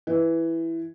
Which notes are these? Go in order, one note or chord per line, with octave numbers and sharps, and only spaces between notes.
E3